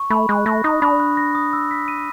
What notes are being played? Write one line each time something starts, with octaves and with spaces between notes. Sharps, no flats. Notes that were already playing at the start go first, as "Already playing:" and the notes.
Already playing: C#6
A3 B5
G#3 F#6
A3 A#6
D#4 D#6
D4 B5
F#6
A#6
D#6
E6
B6
D#7